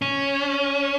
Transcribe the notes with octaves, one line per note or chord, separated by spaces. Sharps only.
C#4